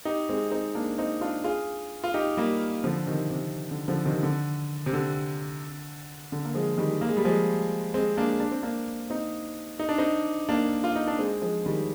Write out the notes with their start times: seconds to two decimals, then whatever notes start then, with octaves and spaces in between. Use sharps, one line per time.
0.05 D#4 G4
0.29 G#3 C4
0.51 C4 D#4
0.75 A#3 D4
0.98 C4 D#4
1.21 D4 F4
1.44 F4 G#4
2.04 F4
2.14 D#4 G4
2.37 G3 A#3
2.84 D3 F3
3.07 C3 D#3
3.30 C3
3.71 D3
3.88 D3 F3
4.05 C3 D#3
4.23 D3
4.86 C3
4.93 D3
6.32 D3
6.45 A#3
6.54 F3 G#3
6.78 D#3 G3
7.01 A#3
7.09 G#3
7.17 G3
7.25 F3 G#3
7.94 G#3 C4
8.17 A#3 D4
8.40 D4
8.51 C4
8.63 A#3 D4
9.10 C4 D#4
9.79 D#4
9.89 D4
9.98 C4 D#4
10.49 A#3 D4
10.84 F4
10.96 D#4
11.07 D4
11.19 G#3 C4
11.42 F3 G#3
11.66 D#3 G3